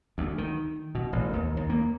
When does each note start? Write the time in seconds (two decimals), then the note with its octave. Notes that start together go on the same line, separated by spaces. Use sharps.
0.18 D2
0.38 D#3
0.95 B2
1.13 A1
1.33 D#2
1.57 D#2
1.70 A#3